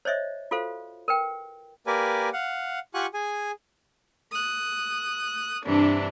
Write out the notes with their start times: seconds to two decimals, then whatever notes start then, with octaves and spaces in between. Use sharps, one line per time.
0.05 C5 C#5 D#5 E5
0.51 F4 F#4 A4 C5 F5
1.08 A#4 B4 G5
1.87 A#3 G4 A#4 B4 D5 G#5
2.33 F5 F#5
2.94 F4 G4 F#5 G#5 C#6 F#6
3.14 G#4 G#5
4.31 D#6 F#6
5.66 G2 C3 E3 D4